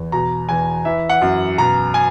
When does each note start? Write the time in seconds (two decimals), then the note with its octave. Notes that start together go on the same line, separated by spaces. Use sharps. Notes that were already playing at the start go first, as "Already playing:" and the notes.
Already playing: E2
0.12 B2 A#5
0.49 E2 G#5
0.85 E3 E5
1.10 F#5
1.22 F#2
1.58 B2 A#5
1.94 G#5